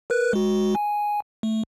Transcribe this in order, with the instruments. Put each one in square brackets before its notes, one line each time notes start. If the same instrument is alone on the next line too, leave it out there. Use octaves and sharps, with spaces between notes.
[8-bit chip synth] A#4 B4 F#6
G#3 F#4
G#5
A3